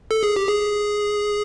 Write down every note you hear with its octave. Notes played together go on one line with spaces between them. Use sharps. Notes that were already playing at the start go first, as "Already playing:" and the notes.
A4
G#4
G4
G#4